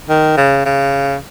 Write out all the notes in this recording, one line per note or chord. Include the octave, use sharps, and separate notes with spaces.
D#3
C#3
C#3